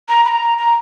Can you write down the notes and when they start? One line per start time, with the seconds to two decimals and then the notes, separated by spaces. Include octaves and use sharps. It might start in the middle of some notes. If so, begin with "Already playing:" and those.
0.09 A#5
0.25 B5
0.28 A#5
0.58 A#5